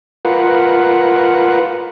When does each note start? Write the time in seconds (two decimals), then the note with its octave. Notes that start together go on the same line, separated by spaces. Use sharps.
0.25 F4 A#4 B4 F#5